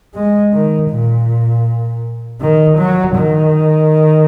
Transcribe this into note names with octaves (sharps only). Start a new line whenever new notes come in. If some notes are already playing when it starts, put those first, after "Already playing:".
G#3
D#3
A#2
D#3
F#3
D#3